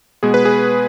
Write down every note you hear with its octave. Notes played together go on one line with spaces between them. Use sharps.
B2 G#3 B3 G#4
B4
G#4